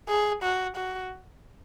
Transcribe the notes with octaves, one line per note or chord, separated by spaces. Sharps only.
G#4
F#4
F#4